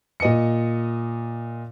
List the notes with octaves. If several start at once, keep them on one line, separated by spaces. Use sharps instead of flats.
A#2 D#5 C#7